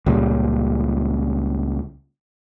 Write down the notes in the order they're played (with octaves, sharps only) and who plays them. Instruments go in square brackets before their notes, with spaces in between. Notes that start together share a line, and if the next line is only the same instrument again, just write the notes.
[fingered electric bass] C#2 A#2 G3